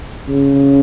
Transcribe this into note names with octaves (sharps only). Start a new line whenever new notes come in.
C#3